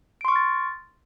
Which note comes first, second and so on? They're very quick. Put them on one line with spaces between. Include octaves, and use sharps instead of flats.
D7 C6 C#6 F6 A6